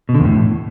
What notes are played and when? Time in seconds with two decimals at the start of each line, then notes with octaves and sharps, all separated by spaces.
0.09 B2
0.14 D3
0.20 E2
0.25 A2